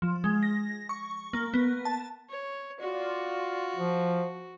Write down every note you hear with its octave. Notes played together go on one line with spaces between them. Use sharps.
F3
G#3
A#6
C#6
A#3
B3
A5
C#5
F4 F#4 D5
F3